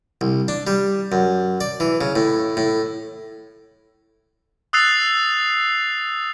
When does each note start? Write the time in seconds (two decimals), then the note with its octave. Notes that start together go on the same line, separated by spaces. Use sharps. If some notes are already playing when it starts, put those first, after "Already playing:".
0.21 C2
0.48 D4
0.67 G3
1.12 F#2
1.61 D5
1.80 E3
2.01 C#3
2.16 A2
2.57 A2
4.73 D#6 E6 F#6 A6 C7 F7